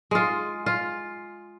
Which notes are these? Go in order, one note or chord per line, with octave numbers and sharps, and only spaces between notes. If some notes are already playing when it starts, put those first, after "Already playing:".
G#3 F4
F4